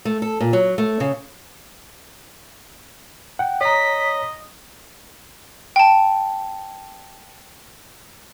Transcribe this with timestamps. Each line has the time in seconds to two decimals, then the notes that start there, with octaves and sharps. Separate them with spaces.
0.05 A3
0.22 A4
0.40 A#2
0.53 F#3
0.78 A3
1.00 C#3
3.39 F#5 G5
3.61 C#5 D#5 A#5 B6
5.76 G5 A5